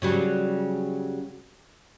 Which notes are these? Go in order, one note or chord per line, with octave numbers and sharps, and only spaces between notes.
C#3 F#3 G3